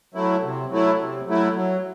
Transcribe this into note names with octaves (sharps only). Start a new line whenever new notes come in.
F#3 A3 E4
C3
F#3 A3 E4
C3
F#3 A3 E4
F#3